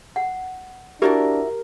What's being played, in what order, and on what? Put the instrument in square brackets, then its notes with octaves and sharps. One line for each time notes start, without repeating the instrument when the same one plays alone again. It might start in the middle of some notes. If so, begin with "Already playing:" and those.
[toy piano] F#5
[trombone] D4 [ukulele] E4 F#4 D5 [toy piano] G4 [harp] A#4